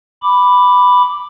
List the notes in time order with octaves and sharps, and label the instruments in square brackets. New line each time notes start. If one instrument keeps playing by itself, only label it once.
[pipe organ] B5 D6